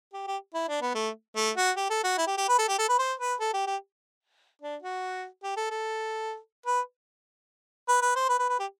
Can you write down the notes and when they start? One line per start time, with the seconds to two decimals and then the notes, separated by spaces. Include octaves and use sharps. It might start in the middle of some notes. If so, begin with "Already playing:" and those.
0.13 G4
0.27 G4
0.54 E4
0.68 D4
0.82 B3
0.95 A3
1.36 A3
1.57 F#4
1.77 G4
1.90 A4
2.04 F#4
2.18 E4
2.27 G4
2.38 G4
2.49 B4
2.59 A4
2.68 G4
2.79 A4
2.89 B4
2.99 C5
3.20 B4
3.40 A4
3.54 G4
3.67 G4
4.62 D4
4.83 F#4
5.43 G4
5.57 A4
5.71 A4
6.66 B4
7.88 B4
8.02 B4
8.16 C5
8.29 B4
8.39 B4
8.49 B4
8.60 G4